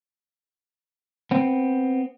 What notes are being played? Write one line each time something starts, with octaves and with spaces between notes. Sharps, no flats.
B3 C4